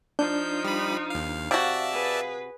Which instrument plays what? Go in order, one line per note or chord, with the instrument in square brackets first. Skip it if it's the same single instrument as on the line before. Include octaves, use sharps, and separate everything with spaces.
[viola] F3 D#4 [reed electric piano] D4 [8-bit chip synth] G6
[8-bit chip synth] G3 B5
D#2 F5
[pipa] C3 F#4 [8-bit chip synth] D5 E5 A5 [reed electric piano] F5
[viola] G#4 B4